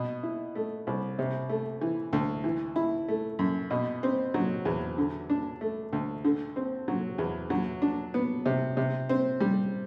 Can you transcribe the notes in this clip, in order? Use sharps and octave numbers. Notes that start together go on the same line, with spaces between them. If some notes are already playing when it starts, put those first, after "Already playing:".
Already playing: B2
E4
A3
C2
C3
A3
E3
D2
E3
E4
A3
F#2
B2
C4
F#3
E2
D3
D4
A3
D2
D3
C4
F#3
E2
F#3
D4
B3
C3
C3
C4
G3